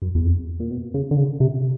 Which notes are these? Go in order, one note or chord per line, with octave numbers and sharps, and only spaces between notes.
F#2
E2
F2
A#2
B2
C#3
D3
C#3
C3